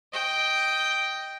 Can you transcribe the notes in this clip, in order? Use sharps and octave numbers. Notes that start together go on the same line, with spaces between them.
D#5 G5